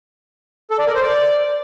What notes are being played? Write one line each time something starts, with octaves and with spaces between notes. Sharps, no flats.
A4
D5
A#4
C5
D5